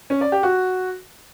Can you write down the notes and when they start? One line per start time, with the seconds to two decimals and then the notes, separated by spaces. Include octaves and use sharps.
0.10 C#4
0.21 D5
0.32 G4
0.43 F#4